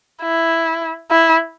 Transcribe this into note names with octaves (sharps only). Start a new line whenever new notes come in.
E4
E4